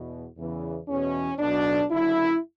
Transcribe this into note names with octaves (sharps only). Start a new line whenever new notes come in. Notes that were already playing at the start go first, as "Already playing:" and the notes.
Already playing: E2 B2
E2 C#3 E3
E2 B2 C#4
B1 B2 D4
F#1 F#2 D3 E4